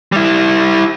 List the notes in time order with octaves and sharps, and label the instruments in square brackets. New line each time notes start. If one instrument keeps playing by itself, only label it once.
[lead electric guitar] G3 E4